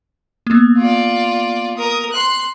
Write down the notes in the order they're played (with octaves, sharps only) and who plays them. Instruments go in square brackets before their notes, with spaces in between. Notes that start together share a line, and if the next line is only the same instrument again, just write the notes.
[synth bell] A#3 B3
[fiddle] F4 D5
A#4 D#6
C6 F#6